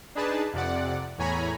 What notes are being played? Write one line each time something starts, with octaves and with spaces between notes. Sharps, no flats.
D4 D#4 G#4 B4 A5
F2 C3 D5 F#5
E2 A2 C#5 G#5 A#5 B5